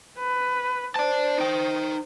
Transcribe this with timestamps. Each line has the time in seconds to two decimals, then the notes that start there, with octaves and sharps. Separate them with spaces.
0.18 B4
0.96 C5 D5 A5
1.38 D#4 G5